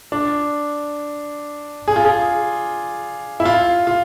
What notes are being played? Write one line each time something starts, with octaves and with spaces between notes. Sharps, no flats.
D4
G#4
F4
G#4
E4
F4
F4